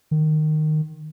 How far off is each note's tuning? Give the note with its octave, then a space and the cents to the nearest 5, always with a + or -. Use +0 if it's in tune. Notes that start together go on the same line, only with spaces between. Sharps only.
D#3 -15